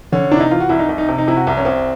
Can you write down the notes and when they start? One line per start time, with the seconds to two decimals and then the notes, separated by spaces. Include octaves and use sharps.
0.12 D3 C#4
0.31 C3 D4
0.37 E4
0.40 D#4
0.51 E3 F4
0.60 F#4
0.69 C2 E4
0.79 D#4
0.89 C2
0.98 D#4
1.08 C3
1.18 D#4
1.28 C3 E4
1.36 F#4
1.47 C2
1.57 C#4
1.65 C2 C4